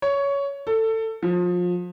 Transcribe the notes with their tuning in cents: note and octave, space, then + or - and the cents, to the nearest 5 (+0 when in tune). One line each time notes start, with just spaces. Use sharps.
C#5 +15
A4 +20
F3 +30